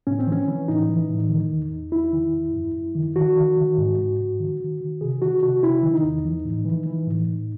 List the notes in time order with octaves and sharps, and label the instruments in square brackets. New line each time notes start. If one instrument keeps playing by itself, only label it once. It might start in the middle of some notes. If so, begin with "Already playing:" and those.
[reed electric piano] A2 C#4
C4
E3 C#4
E3
A2 D#4
E3
A2
D#3
E2
E2
E2 E4
D#3
E2
F#2
F#2
D#3
D#3 F#4
D#3
D#3
G#2
G#2
G#2
D#3
D#3
D#3
C3 G#4
D#3 F#4
C3 F#4
C3 E4
D#3
D#4
E2
E3
A2
E3
E3
A2
A2